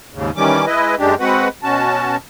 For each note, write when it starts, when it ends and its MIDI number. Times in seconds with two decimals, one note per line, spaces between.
0.14 0.31 39
0.14 0.31 44
0.14 0.31 49
0.36 0.65 51
0.36 0.65 52
0.36 0.65 55
0.36 0.65 61
0.36 0.65 86
0.66 0.95 56
0.66 0.95 64
0.66 0.95 71
0.66 0.95 75
0.98 1.15 42
0.98 1.15 56
0.98 1.15 62
0.98 1.15 67
1.20 1.48 56
1.20 1.48 60
1.20 1.48 66
1.20 1.48 71
1.20 1.48 78
1.63 2.16 47
1.63 2.16 61
1.63 2.16 66
1.63 2.16 81